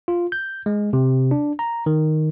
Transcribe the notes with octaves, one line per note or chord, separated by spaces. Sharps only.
F4
G6
G#3
C3
D4
A#5
D#3